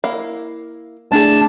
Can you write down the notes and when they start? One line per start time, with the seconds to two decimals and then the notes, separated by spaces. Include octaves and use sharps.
0.04 A#3 E4 F5
1.12 A3 D4 E4 G#4 A5